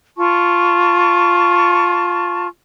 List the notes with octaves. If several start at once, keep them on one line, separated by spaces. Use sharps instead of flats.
F4 A5 C#6